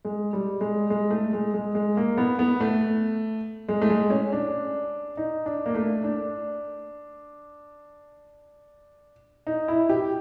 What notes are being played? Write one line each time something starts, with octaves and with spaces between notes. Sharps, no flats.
G#3
G3
G#3
G#3
A3
G#3
G#3
G#3
A#3
B3
B3
A3
G#3
A3
G#3
C#4
D4
D#4
D4
A#3
A3
D4
D#4
E4
G4